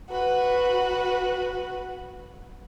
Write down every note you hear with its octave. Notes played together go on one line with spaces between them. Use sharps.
F#4 B4